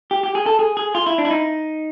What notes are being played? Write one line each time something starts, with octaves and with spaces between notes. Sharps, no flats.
G4
G4
G#4
A4
G#4
G#4
F4
E4
D4
E4
D#4